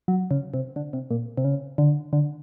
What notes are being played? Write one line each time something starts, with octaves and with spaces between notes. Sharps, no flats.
F#3
C#3
C3
D3
C3
A#2
C3
C#3
D3
D3